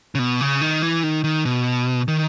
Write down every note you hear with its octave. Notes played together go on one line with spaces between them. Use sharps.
C#3
B2
C#3
D#3
E3
D#3
D#3
B2
D#3